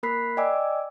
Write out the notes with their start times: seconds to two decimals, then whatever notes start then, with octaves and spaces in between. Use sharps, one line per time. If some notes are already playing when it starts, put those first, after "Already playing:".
0.03 A#3 A#4 B5 F#6 B6 C7
0.37 D5 D#5 G5 G#5 D6 E6